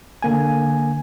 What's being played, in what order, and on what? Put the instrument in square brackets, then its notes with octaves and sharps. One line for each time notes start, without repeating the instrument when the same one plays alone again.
[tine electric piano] D3 A#3 G#5